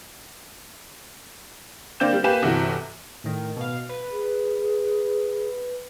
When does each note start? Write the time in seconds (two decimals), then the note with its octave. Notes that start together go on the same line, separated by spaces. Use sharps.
2.00 D3 A#3 C4 D5 G6 E7
2.13 G3
2.24 A#3 G4 B4 G#5 E7
2.42 G1 C3 E3 F#4
3.24 A2 D#3
3.56 B2 F5
3.89 B4
4.11 G#4